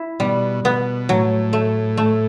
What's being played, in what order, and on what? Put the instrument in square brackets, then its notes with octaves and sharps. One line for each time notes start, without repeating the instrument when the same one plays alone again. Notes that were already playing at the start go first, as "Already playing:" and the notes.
Already playing: [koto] E4
[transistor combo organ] B2 [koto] G3
[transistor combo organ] B2 [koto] B3
[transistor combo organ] A2 [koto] F#3
[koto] A3
A3